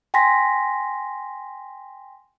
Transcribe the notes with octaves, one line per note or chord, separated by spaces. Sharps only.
G5 G#5 C6 A#6 B6